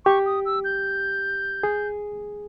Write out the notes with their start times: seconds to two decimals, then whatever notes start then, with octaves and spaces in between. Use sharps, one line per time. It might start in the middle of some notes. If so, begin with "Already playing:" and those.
0.05 G4 C#6
0.26 D#6
0.46 E6
0.64 G6
1.63 G#4